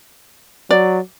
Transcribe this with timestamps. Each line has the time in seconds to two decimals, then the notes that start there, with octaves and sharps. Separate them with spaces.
0.70 F#3 D5